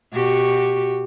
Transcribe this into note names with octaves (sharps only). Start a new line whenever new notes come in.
B2 F#4 G4